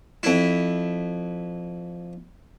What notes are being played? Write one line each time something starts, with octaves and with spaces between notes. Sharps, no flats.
F2 E4